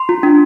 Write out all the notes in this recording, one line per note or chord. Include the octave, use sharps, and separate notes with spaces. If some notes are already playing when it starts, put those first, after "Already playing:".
Already playing: C6
F4
D4